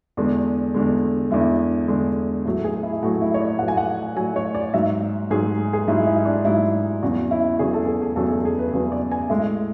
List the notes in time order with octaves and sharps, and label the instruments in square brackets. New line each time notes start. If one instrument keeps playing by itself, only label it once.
[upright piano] E2 D3 G#3 D4
E2 D3 G#3
E2 D3 G#3 E4
E2 D3 G#3
A2 F#3
G#4
E4
A2 F#3 F#4
E4
C#5
D5
A2 F#3 F#5
G#5
F#5
F#3 G#5
A2
C#5
D5
G#2 F#3 E5
G#2 F#3 G#4
G#4
G#2 F#3 E4
E4
D4
G#2 F#3 E4
E2 C#3 F#3 F#4
E4
E2 C#3 F#3 G#4
A4
G#4
G#4
E2 C#3 F#3 A4
G#4
G#4
B4
E2 C#3 F#3 B4
D5
G#5
A2 G#3 E5